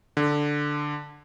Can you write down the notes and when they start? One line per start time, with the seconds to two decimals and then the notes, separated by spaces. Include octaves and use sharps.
0.17 D3